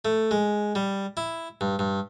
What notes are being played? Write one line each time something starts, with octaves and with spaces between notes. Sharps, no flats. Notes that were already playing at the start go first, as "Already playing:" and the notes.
A3
G#3
G3
E4
G2
G2